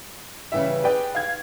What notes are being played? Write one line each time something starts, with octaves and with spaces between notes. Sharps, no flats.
C#3 E3 G3 E5
G#4 B4 D5 G5
F5 G#6